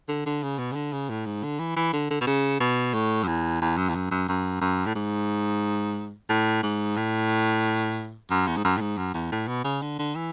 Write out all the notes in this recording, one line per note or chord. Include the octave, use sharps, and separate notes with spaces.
D3
D3
C#3
B2
C#3
D3
C#3
A2
G#2
D3
E3
E3
D3
D3
B2
C#3
B2
A2
F#2
E2
E2
F#2
E2
F#2
F#2
F#2
F#2
A2
G#2
A2
G#2
A2
F#2
E2
G#2
F#2
A2
G#2
F#2
E2
A2
B2
C#3
D3
D3
E3